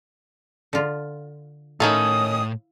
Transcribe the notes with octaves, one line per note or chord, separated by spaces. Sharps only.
D3 F4
A2 D#3 C#4 E4 A4 F5 D#6